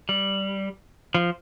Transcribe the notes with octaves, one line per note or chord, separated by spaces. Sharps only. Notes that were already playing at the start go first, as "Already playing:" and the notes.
G3
F3